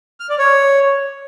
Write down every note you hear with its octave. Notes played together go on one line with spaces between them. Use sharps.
F6
D5
C#5